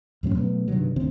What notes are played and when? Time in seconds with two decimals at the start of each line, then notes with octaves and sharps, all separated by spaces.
0.23 E2 A2 F#3 C#4
0.35 B2 F#3 A3 B3
0.68 G2 C3 D#3 F#3
0.96 D2 D#3 C4